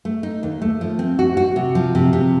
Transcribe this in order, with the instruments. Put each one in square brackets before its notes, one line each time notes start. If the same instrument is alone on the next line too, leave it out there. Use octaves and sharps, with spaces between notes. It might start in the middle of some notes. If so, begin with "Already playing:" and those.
[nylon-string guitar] A3
D#4
D#2
A3
F3
C4
F#4
F#4
C3
F3
C3
C3